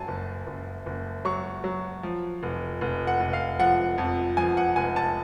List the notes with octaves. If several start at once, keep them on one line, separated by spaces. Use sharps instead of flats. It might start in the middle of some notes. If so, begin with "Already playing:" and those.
Already playing: F#2 F#3 G#5 A5
F#1
F#1
F#1
F#3 C#6
F#3
F3
F1
F1
F#5
F1
F5
F3 F#5
F2
F3 G#5
F#5
F1 G#5
A5